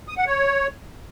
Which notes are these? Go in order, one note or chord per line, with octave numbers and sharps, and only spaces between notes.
D#6
F#5
C#5